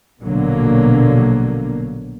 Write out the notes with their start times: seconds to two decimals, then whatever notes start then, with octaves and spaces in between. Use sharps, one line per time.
0.23 A#1 B2 D3 F#3 A#3